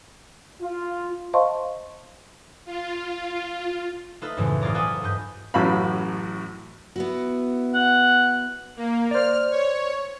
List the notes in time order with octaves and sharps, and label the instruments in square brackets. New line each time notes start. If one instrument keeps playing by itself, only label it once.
[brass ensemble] F4
[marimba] C5 D#5 F5 A5 C6 C#6
[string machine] F4
[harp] A3 D#4 F4 A4 B4 D#5
C#2 F#2 A2 E3 G#3 C4
E1 F4 G#4 D5 A#5
F4 A4 B4 F#5 G#5 D#6
G2 B4 D#5 G6
[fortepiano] A1 F#2 A2 F#4 F5 B5
[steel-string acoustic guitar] B3 E4 F#4
[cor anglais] F#5
[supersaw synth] A#3
[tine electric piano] C5 D5 [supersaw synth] F6
[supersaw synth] C#5